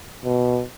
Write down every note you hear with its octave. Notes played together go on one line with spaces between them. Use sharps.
B2